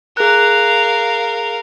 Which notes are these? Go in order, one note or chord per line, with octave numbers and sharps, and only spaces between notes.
G#4 A#4 F5 F#6